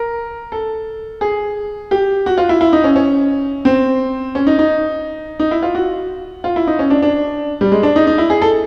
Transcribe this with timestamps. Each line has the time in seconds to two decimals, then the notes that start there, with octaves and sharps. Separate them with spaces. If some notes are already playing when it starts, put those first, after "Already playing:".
Already playing: A#4
0.52 A4
1.21 G#4
1.91 G4
2.26 F#4
2.38 F4
2.49 E4
2.61 E4
2.73 D#4
2.84 C#4
2.96 C#4
3.65 C4
4.35 C#4
4.47 D#4
4.59 D#4
5.39 D#4
5.51 E4
5.63 F4
5.75 F#4
6.44 F4
6.56 E4
6.67 D#4
6.79 C#4
6.90 D4
7.02 D4
7.61 G3
7.72 G#3
7.83 D4
7.96 D#4
8.07 D#4
8.18 E4
8.30 G#4
8.42 A4